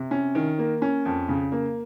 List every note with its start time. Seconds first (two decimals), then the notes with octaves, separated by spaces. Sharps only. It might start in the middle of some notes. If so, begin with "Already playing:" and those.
Already playing: C3
0.11 C#4
0.35 D#3
0.58 A#3
0.82 C#4
1.05 F2
1.28 C#3
1.52 A#3